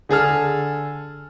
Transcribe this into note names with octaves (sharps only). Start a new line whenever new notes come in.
D3 G#4 A4 F6